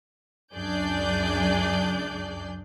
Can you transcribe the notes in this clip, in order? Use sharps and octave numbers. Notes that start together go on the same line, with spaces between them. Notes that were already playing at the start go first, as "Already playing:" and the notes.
C#2 F#2 D4 G#4 D5 G6